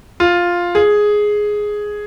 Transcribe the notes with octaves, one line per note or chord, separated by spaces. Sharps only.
F4
G#4